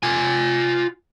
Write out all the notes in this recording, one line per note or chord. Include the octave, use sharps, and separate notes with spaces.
F4 G#5